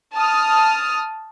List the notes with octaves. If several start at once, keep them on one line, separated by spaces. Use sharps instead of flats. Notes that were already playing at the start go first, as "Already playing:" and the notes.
A5 D#6 F6